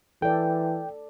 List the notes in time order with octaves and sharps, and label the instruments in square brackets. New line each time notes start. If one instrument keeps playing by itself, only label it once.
[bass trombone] E3 [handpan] A4 D5 [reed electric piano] G5